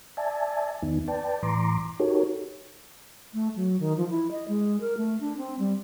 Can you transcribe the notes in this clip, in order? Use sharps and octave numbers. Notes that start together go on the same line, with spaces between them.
D5 E5 G#5 A5
E2 D#3 B3 D#4
B4 D5 G5 A5
A2 E3 A#5 C6 D6
D#4 F#4 G4 A4 A#4 C#5
A3
F#3
D#3
F3
E4
D#5
G#3
A#4
A3
D4
C4
G3